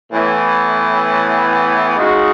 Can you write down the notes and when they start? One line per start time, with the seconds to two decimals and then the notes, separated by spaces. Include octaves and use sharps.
0.12 A2 E3 B3
1.97 C#3 G#3 D#4 F#4